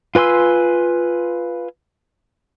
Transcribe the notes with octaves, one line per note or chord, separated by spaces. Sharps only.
F4 B4 G#5 C6 E6